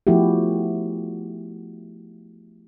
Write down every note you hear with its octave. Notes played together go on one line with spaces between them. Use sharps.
F3 A3 B3 E4 F#4 G4